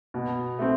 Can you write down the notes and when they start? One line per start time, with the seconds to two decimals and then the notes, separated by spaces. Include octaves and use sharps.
0.14 B2
0.59 A3 C4